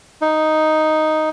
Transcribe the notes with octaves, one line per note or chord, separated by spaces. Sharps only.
D#4